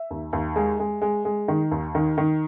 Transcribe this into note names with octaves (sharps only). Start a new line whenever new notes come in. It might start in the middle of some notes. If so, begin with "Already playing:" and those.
Already playing: E5
D#2
D#2
G#3
G#3
G#3
G#3
D#3
D#2
D#3
D#3